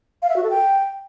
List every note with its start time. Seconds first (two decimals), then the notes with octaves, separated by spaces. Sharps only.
0.22 F5
0.29 E5
0.36 F#4
0.43 A4
0.50 G5